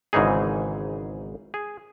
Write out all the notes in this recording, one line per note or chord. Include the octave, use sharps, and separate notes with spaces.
G#1 G#2 C#3 E3 D#4 G#4
G#4